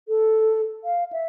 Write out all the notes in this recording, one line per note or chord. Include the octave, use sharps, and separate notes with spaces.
A4
F5
E5